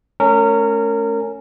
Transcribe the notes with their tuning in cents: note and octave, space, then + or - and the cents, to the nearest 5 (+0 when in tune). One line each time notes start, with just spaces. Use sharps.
A3 -30 C#4 +5 A#4 -25